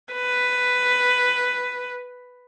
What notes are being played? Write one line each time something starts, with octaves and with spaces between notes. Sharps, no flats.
B4